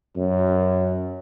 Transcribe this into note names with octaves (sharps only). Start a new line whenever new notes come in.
F#2